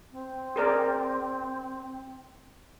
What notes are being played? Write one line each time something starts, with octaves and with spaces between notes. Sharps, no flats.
C4
G#4 A#4 D5